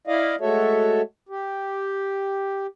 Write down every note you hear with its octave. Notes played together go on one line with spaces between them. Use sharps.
E4 D5 D#5 F5
G#3 A3 F#4 A4 C#5 E5
G4